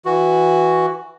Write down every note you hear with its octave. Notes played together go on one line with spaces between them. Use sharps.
E3 F#4